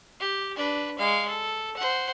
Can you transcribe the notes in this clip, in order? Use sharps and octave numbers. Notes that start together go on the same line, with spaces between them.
G4
D4 B4
G#3 F5
A4
C5 F#5